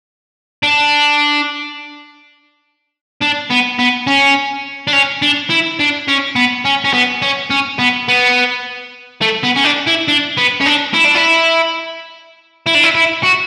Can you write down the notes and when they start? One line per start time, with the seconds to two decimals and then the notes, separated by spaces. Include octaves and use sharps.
0.63 D4
3.21 D4
3.50 B3
3.79 B3
4.07 C#4
4.88 D4
4.93 C#4
5.22 D4
5.50 E4
5.79 D4
6.08 C#4
6.36 B3
6.65 C#4
6.84 C#4
6.93 B3
7.22 C#4
7.50 C#4
7.79 B3
8.08 B3
9.22 A3
9.44 B3
9.57 C#4
9.65 D4
9.87 E4
10.08 D4
10.37 B3
10.61 C#4
10.66 D4
10.94 E4
11.05 D4
11.15 E4
12.66 E4
12.75 D4
12.83 E4
12.95 E4
13.23 F#4